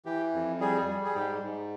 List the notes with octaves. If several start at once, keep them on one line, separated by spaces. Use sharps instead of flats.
E3 G4
F2
G3 G#4
G3
G#4
G#2 G4
G#2